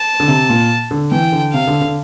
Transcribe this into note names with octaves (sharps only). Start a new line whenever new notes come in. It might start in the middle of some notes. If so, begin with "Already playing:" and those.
Already playing: A5
D3
C3
A#2
D3
E3 G5
D3
C3 F5
D3
D3